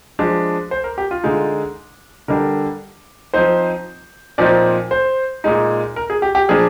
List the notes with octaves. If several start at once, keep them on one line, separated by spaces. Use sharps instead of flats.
F3 G#3 D4
C5
A#4
G4
F4
D3 G#3 D#4
D3 G3 D4 A#4
F3 C4 D#4 C5
A#2 F3 C4 D#4 D5
C5
A#2 G#3 D#4
A#4
G#4
G4
G4
A#2 F3 A#3 D4 G#4